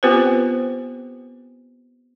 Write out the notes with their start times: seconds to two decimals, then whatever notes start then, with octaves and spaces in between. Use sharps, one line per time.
0.03 B3 C4 F4 G4 B4 C5